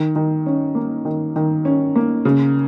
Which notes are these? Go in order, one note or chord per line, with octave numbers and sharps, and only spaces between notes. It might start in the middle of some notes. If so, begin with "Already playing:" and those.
Already playing: D#3
D#3
C#4
A#3
D#3
D#3
C#4
A#3
C#3